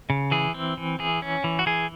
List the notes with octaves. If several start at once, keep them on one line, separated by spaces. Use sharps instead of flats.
C#3
E3 G#4
C4
E3
E3 G#4
C#4
E3
F#4
E3 G#4